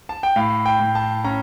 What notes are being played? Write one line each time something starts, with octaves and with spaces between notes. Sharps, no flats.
A5
G5
A2 F5
G5
A2
A5
C#4 A#5